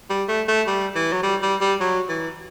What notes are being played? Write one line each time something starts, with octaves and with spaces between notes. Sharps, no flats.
G3
A3
A3
G3
E3
F#3
G3
G3
G3
F#3
E3